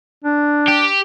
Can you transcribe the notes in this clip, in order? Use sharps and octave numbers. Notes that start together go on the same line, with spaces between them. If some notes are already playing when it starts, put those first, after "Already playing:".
D4
G4